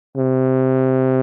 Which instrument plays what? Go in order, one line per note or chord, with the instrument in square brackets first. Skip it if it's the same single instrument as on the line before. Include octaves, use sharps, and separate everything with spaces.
[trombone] C3